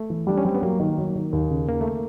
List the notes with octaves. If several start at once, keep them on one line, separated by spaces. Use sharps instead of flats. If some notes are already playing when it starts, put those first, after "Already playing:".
Already playing: A3
E3
G3 D4
C#4
G3 C4
B3
F#3 A#3
D#3
F#3
D#3
D#2
C#3
D#2 A#3
A3